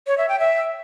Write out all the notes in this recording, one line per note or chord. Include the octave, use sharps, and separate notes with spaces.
C#5
E5
G5
E5